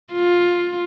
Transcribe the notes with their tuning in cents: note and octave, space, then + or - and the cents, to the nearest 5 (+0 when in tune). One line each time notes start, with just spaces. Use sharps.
F4 +10